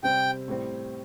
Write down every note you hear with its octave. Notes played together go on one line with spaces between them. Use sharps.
C3 G3 C4 G5
A2 G3 C4